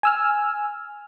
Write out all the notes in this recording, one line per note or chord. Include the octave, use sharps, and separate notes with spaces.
G#5 E6 F6